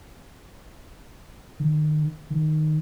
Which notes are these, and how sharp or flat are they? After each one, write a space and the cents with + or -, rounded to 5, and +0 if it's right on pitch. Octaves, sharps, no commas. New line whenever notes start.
D#3 -35
D#3 -10